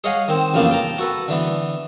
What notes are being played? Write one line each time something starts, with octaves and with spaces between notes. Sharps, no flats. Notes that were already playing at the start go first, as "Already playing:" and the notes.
G#4 C#5 D#5 F5 F#5 G#5
D#3 C4
A1 F2 C#3 A#3 B3 A5
G5 A5 A#5
F#4 A4 B4
D3 E3 B3